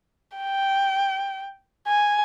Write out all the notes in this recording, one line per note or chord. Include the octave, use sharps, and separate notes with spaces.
G5
G#5